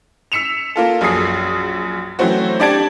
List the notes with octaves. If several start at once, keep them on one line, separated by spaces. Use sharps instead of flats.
E6 B6 C#7 E7 F7
A#3 F4 A4
A#1 F#2 G#4 D#6 C7
E3 F#3 A3 C4 F#4
D4 G4 D5 A5 G#6 D7